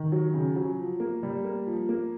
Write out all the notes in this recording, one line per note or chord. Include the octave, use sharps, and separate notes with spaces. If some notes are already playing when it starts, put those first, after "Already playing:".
Already playing: D#3
F#3
C#3
F#3
F3
A#3
G3
A#3
F3
A#3